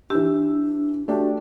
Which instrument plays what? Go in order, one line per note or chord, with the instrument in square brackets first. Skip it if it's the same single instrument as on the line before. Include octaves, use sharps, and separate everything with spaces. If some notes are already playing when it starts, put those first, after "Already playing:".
[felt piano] E3 E6 [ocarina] D4 [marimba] G4
[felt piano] A3 D4 G4 [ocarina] F#4